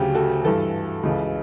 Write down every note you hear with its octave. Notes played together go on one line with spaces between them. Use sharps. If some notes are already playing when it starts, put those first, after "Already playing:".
Already playing: D2 C#3 F#3 G4
F#4 A4
G2 E3 F#4 A4
C#2 C#3 E3